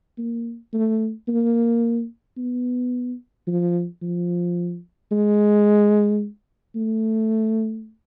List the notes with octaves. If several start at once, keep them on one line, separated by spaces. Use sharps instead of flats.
A#3
A3
A#3
B3
F3
F3
G#3
A3